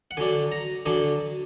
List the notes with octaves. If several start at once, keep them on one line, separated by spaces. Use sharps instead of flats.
F#5
D3 F#3 D4 G#5
A#5
D3 F#3 D4 G#5